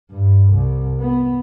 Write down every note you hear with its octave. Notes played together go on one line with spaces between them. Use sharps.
G2
C2
B3